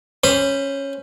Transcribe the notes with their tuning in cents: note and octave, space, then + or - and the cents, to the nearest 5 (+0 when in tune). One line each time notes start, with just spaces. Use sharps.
C#4 -10 C5 +5 B5 +0